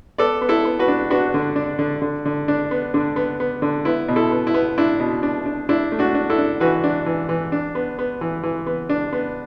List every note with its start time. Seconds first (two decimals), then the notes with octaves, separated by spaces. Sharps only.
0.18 B3 A4 D5
0.41 B3
0.49 E4 A4
0.65 B3
0.79 F#4 B4
0.88 D4
1.10 B3 D4 F#4
1.34 D3
1.56 D4
1.79 D3
2.02 D3
2.25 D3
2.48 D4
2.71 B3
2.94 D3 D4
3.16 B3
3.40 B3
3.62 D3
3.85 B3 E4
4.08 B2
4.16 E4 A4
4.31 B3
4.47 E4
4.54 B3
4.78 D4 E4
5.00 B2
5.23 D4
5.46 D4
5.69 D4 E4
5.92 A3
5.99 D4 F#4
6.15 D4
6.30 E4 A4
6.38 D4
6.60 E3 F#4 B4
6.84 D4
7.06 E3
7.29 E3
7.52 D4
7.75 B3
7.99 B3
8.21 E3
8.43 E3
8.66 B3
8.89 D4
9.13 B3